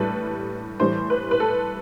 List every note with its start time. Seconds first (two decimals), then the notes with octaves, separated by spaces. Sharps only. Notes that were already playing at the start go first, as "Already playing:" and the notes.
Already playing: A2 G3 A4 B4
0.80 A2 E3 G3 C5
1.10 B4
1.31 B4
1.40 A4